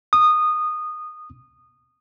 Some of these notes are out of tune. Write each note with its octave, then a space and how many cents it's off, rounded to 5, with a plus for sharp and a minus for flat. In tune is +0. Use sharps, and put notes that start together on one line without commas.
D#6 -15